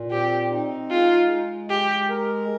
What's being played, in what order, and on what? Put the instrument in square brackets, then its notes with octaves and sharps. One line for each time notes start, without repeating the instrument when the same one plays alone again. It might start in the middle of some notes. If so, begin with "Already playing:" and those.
Already playing: [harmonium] A#2
[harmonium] C4 [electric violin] G4
[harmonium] D#4
[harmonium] G#3 [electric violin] F4
[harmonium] G#3
[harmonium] G#3 [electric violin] G4
[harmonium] A#4